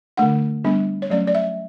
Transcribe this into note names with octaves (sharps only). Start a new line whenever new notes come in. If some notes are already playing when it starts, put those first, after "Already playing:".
D3 A3 D4 F#5
G3 B3 D4
C#5
F#3 A3 C#4 D5
D5
E5